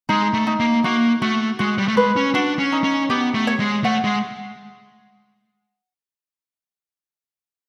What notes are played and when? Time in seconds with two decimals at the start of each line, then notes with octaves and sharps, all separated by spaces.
0.09 G#3 D#4
0.34 A3
0.47 D#4
0.60 A#3
0.84 A#3 F#4
1.22 A3 F#4
1.59 G#3 F#4
1.78 G3
1.88 A3
1.97 G#3 B4
2.16 C#4
2.34 D4 F#4
2.59 C#4
2.72 D#4
2.84 C#4
3.10 B3 G4
3.34 A3
3.47 C#5
3.60 G#3
3.84 A3 F#5
4.04 G#3